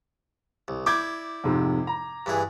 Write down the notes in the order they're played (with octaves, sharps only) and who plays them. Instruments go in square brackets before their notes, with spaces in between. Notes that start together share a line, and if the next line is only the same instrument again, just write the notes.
[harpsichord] C2
[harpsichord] E4 D5 [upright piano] D6 G6 G#6
[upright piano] F2 G#2 C3
A#5
[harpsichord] G2 E3 G#4